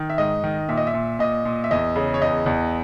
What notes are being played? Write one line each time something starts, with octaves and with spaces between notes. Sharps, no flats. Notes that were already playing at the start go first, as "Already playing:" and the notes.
Already playing: D#3
E5
G#2 D#5
D#3
A#2 E5
D#5
E5
A#2
A#2 D#5
A#2
E5
E2 D#5
C#3
C#5
E2 D#5
E2